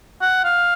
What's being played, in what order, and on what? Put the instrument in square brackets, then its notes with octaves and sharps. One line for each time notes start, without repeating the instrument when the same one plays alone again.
[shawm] F#5
F5